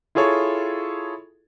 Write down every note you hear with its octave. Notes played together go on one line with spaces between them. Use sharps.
E4 F4 G#4 A4 C#5